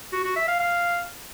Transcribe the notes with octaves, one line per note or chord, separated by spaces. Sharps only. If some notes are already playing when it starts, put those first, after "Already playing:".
F#4
F#4
E5
F5
F5